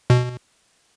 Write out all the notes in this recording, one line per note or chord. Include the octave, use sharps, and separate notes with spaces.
B2